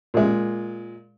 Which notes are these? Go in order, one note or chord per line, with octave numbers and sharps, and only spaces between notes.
A#2 G#3